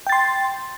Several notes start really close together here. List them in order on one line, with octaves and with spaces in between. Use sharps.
G5 A6 C6